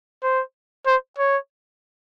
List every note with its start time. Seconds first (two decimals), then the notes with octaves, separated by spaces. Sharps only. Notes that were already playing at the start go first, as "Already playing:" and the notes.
0.23 C5
0.87 C5
1.18 C#5